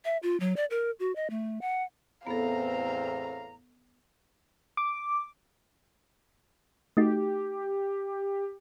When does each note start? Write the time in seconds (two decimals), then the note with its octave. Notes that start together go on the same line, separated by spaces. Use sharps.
0.05 E5
0.23 F4
0.40 F#3
0.56 D5
0.70 A#4
1.00 F#4
1.16 D#5
1.30 A3
1.61 F#5
2.27 E2 A2 B3 C4 A4 F5 A#5
4.77 D6
6.97 A3 D#4 F#4 G4